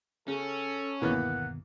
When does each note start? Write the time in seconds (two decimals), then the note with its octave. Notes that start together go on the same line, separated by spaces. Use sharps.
0.28 C#3 C#4 A4
1.02 G1 D#2 B2 E3 A#3 B3 F#5